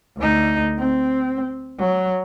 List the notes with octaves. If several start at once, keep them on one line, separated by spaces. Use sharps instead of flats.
D2 D#4
C4
F#3